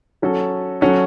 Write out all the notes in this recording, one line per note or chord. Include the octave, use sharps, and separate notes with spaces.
F#3 C#4 F#4 A4
F#3 C#4 F#4 A4